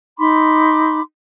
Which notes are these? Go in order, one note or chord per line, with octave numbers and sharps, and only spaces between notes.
D#4 B5 C6 D6